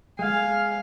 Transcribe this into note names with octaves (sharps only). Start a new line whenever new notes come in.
G#3 F5 G#5